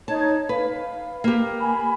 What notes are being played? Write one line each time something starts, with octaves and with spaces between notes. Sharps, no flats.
D#4 C#5 A5 G#6
B4 F5
A#3 G4
G#5 B5